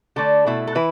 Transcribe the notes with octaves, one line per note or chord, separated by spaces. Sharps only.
D3 A3 D4 A4
B2 A3 E4
A4
E3 E4 B4